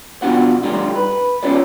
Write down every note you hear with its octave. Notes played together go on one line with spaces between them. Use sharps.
B2 D4 F4 F#5
A2 D3 G3 D#4 F4
B4
C#4 E4 F4 C#5 D5